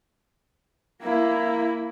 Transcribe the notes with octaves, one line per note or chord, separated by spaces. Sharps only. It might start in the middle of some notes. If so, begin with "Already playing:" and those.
A#3 E4